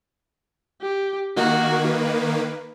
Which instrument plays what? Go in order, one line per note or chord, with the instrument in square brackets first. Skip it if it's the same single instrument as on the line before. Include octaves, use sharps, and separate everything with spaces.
[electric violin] G4
[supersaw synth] D#3 A#3 [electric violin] F#4
[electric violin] B4